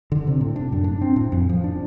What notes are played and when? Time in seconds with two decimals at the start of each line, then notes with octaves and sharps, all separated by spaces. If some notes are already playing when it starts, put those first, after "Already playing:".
0.12 D3
0.27 C3
0.41 A2
0.56 D4
0.72 F#2
0.84 D4
1.02 C4
1.16 A2
1.32 F2
1.49 F3
1.64 D4